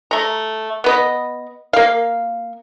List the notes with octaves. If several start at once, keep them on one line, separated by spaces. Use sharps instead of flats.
A3 A#5
B3 B4 D#5
A#3 F5